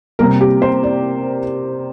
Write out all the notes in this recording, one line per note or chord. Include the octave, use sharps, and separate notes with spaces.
C3 G3 A#3 A#4
G4
C5
D5